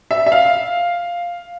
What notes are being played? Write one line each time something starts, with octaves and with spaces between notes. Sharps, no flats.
E5
E5
F5